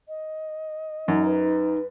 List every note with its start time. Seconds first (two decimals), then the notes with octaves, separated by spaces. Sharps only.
0.08 D#5
1.08 F#2 D#4
1.25 B4